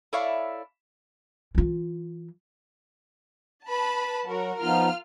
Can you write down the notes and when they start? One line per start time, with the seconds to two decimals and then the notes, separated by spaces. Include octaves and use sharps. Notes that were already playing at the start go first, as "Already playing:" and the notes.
0.13 E4 A4 C#5 D5 E5 F5
1.55 E3 F4
3.67 B4 A5 B5
4.25 F#3 F#4 A#4
4.62 F3 B3 D#4 F4 F6